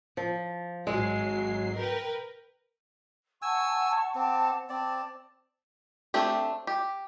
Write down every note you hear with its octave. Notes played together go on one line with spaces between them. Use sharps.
F3
G#1 F#3 G#3 C7
A#4 B4 G5
F#5 G#5 A5 C#6 E6
C4 F#5 A5 D6
C4 D5 A5
A3 C4 D4 G4
G4